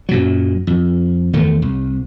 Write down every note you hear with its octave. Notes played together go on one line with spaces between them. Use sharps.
F#2 A#2 F#3
F2
E2 D#3 A3
C2